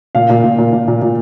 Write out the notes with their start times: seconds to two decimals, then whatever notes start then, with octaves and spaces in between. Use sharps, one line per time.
0.15 A#2 F5
0.30 A#2
0.44 A#2
0.58 A#2
0.73 A#2
0.88 A#2
1.02 A#2